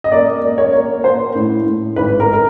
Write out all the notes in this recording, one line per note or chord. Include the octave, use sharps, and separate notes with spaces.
D#5
A#3 D5
A#3
C#5
A#3
A#3 C5
A2
A2
G#1 B4
A#4
A#4